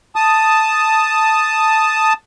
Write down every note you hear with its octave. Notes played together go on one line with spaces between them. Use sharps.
A5 D#6